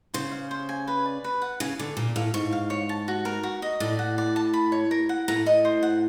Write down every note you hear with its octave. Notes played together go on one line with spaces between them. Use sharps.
C#3 C5
F5
C5
G#5
B4
D5
B4
F#5
C#3 G#5
D3 D5
A#2 A#4
A2 F5
G#2 C#6
F5
C#5
A5
F#4
A#4
F#4
D#5
A2 D5
F#5
D5
A5
B5
C#5
A#4
F#5
A2 A#5
D#5
C5
F#5